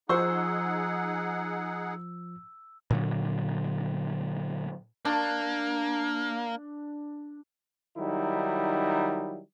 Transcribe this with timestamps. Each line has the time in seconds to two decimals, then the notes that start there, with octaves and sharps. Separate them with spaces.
0.09 F3 D#4 G#4 C5 F#5 C6 C#6 E6
2.91 A#2 D3 F#3
5.05 A#3 D4
7.97 D#3 F#3 G3 D#4 E4